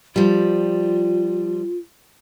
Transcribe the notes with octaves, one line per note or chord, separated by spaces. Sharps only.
F3 G3 F4